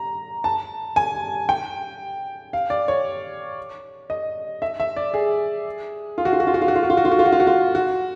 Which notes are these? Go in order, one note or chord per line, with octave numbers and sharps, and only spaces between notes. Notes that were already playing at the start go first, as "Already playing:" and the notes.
Already playing: A#5
A5
G#5
G5
F5
D5
C#5
D#5
E5
E5
D5
G#4
F4
F#4
F4
F#4
F4
F#4
F4
F#4
F4
F#4
F4
F#4
F4
F#4
F4
F#4
F4
F#4
F4
F#4